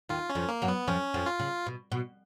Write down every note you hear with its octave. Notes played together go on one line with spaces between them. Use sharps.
D#2 D#3 F4
C#4
F2 F3
A#3
F#2 F#3
B3
F2 F3 C#4
F2 F3
F4
C#3
B2
B2